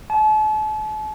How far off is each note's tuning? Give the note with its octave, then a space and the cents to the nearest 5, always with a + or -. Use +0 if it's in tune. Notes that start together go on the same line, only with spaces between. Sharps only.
A5 -40